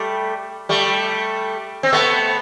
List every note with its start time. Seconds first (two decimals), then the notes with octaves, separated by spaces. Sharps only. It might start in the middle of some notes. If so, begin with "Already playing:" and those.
Already playing: G3 A3
0.69 G3 A3
1.83 C4
1.93 A3 B3